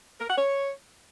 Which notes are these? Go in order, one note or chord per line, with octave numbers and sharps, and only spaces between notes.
A#4
F#5
C#5